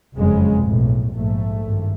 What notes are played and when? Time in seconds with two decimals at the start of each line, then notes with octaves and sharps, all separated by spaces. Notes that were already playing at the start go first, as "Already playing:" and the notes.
0.15 F#1 F2 C#3 G#3
0.64 B1 A2
1.13 A#1 G#2 A3
1.62 G#1 G2